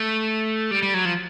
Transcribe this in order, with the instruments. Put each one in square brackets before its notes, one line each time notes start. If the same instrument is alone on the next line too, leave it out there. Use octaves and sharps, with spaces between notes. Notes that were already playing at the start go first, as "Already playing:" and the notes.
Already playing: [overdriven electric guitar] A3
G3
G3
F#3
F3